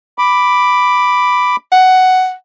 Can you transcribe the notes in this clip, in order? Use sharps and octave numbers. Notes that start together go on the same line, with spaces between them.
B5 D6
F#5